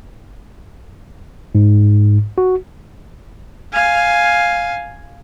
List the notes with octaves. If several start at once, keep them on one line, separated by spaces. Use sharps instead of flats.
G#2
F#4
F5 G#5